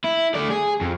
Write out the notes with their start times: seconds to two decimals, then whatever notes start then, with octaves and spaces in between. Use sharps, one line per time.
0.04 E4
0.34 A3 D5
0.50 G#4
0.81 F2